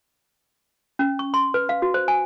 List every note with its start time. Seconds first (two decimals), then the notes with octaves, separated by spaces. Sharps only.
0.99 C#4
1.19 C#6
1.34 C6
1.54 B4
1.69 F5
1.82 F#4
1.94 C5
2.08 G#5